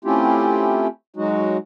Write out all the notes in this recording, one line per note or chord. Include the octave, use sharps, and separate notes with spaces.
A3 C4 C#4 E4 F4 G4
F#3 G#3 D#4 F#4